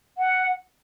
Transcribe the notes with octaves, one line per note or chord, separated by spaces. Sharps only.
F#5